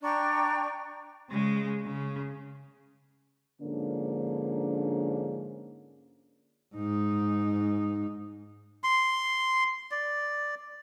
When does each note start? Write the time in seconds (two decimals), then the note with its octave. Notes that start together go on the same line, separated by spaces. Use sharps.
0.02 D4 G5 A#5 C#6
1.31 C#3 G#3
1.85 C#3
3.61 G#2 D3 F3 A#3 C#4 D4
6.75 G#2 D#4
8.84 C6
9.91 D5